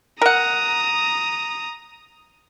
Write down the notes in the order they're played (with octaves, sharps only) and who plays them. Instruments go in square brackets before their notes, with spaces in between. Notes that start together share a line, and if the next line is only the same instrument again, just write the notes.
[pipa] A#4 F#5 [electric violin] A#5 D#6